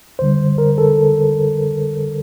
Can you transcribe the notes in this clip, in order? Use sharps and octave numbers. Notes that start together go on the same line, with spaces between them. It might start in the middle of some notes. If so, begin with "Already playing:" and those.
D2 D3 G3 C5
A#4
A4